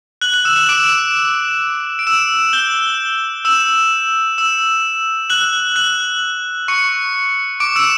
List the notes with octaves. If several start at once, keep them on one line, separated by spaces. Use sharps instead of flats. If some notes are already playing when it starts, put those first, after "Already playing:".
F#6 F#7
F#6 F#7
E6 E7
E6 E7
D6 D7
D7
E6 E7
G6 G7
E6 E7
E6 E7
F#6 F#7
F#6 F#7
C#6 C#7
D6 D7
E6 E7